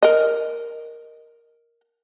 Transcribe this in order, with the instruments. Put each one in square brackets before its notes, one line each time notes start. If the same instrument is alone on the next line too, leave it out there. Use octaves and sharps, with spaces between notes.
[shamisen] A#4 D#5